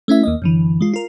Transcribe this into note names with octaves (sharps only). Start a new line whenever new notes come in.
A3 C#4 E4 E5
D#2 A#3 D#5
F#2 D3 E3
G#3 F4
F4 A#4